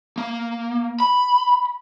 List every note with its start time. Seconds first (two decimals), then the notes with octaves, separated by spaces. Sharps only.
0.18 A#3
1.00 B5